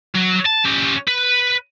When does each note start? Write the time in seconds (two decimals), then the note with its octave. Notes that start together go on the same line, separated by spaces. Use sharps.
0.15 F#3
0.45 A5
0.65 C#4 G4
1.08 B4